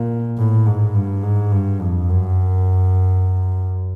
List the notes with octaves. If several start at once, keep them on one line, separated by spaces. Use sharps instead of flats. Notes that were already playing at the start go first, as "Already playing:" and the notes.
Already playing: A#2
A2
G#2
G2
G#2
G2
F2
F#2